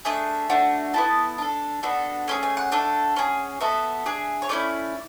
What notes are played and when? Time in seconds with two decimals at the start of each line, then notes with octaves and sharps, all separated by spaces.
0.05 A3 D4 G#4 E5
0.50 A3 D4 F#4
0.94 B3 E4 A4 A5
1.38 D4 A4
1.83 B3 D4 F#4 A4
2.28 A3 C#4 G#4 G#5
2.43 G#5
2.57 F#5
2.72 A3 D4 A4
3.16 C#4 G#4
3.61 B3 F#4 A4 E5
4.06 D4 G#4
4.42 C#5
4.49 A3 C#4 E4 D5